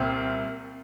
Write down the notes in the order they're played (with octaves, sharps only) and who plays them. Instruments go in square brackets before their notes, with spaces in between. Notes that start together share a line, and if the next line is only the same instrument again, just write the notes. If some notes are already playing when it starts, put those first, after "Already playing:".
Already playing: [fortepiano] C2 A#2 C4